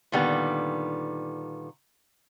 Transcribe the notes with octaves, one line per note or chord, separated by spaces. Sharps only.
A#2 D3 D#3 G3 B3